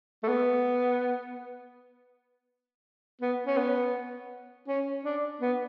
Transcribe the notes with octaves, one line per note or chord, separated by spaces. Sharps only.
A3
B3
B3
C#4
B3
C#4
D4
B3